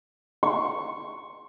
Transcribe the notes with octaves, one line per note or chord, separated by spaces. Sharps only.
C#6